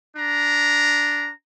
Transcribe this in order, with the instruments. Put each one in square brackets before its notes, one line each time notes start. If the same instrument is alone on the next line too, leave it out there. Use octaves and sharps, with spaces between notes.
[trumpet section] D4 A#5